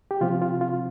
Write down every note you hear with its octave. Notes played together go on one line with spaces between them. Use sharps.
G4
C3 F3 C4 F4
F4
F4